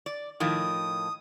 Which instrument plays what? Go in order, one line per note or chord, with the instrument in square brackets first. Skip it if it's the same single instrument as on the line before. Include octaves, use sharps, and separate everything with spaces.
[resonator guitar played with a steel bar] D5
[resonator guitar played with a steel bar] A2 D#3 F3 [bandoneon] D#6